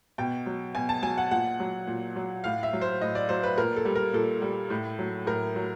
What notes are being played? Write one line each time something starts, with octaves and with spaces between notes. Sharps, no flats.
B2 G5
F#3
B2 G#5
A5
F#3 G#5
F#5
A#2 F#5
F#3
A#2
F#3
A2 F5
E5
F#3
C5
A2 D#5
D5
F#3 C5
B4
A#2 A#4
A4
G3
A#4
A#2 A4
G3
A2
F#3
A2 A#4
F#3